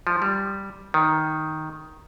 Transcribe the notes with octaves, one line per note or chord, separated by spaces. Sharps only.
F3
G3
D#3